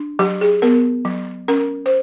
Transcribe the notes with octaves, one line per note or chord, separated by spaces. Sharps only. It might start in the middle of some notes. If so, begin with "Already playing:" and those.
Already playing: D4
F#3 G4
G#4
B3 A#4
F#3
C#4 A#4
C5